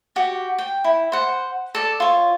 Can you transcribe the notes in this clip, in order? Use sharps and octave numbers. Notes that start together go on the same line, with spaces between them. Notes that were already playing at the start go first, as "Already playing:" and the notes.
F#4 G4
G5
E4
C5 F#5
A4 D5
F4 C#5